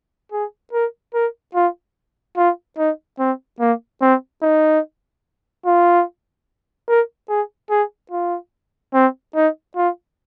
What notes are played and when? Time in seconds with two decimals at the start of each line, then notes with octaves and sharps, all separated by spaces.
0.32 G#4
0.73 A#4
1.14 A#4
1.55 F4
2.37 F4
2.78 D#4
3.19 C4
3.60 A#3
4.02 C4
4.42 D#4
5.66 F4
6.88 A#4
7.29 G#4
7.70 G#4
8.12 F4
8.94 C4
9.35 D#4
9.76 F4